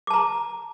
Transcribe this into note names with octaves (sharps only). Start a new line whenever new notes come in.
A5 A#5 D6